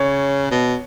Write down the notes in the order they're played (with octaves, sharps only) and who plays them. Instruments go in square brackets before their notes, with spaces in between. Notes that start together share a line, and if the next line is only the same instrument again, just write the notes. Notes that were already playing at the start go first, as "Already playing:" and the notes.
Already playing: [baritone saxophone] C#3 [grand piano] C#5
[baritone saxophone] B2